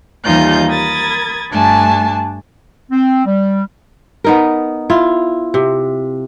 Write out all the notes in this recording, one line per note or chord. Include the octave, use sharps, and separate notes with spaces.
D#2 E3 G3 D#4 F4 G6
A#4 B5 D#6 G#6 A6
G2 A3 D4 G#5 A5
C4
G3
B3 D#4 A#4
E4 F4
C3